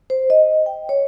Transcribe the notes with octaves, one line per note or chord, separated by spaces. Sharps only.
C5
D#5
G5
C#5